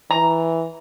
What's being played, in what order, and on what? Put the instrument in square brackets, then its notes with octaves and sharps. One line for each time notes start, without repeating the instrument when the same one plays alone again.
[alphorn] E3 [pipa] A#5